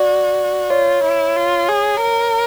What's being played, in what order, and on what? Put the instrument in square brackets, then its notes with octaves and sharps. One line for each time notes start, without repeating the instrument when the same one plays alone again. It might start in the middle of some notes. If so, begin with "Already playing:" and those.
Already playing: [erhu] F#4 [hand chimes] D5
[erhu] F4 [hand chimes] C#5
[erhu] E4
F4
G#4
A#4